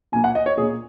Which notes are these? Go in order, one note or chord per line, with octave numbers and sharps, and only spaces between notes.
A#2 A#3 G#5
F#5
D#5
C#5
A#2 G#4
A#3